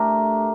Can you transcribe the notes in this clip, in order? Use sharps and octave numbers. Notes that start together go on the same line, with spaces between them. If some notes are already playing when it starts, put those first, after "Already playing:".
Already playing: A3 D4 G4 A#4